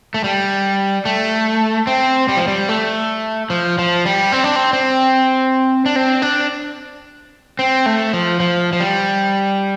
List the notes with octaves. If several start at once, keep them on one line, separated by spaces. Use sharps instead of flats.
A3
G3
A3
C4
G3
F3
G3
A3
F3
F3
G3
C4
D4
C4
C4
D4
C4
D4
C4
A3
F3
F3
F3
G3